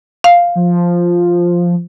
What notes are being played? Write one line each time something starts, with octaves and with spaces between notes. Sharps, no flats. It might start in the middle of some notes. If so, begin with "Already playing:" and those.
F5
F3